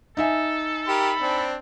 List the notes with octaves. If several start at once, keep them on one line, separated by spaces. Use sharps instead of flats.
D#4 A4 E5 G#5
G4 A#4 B5
C4 D4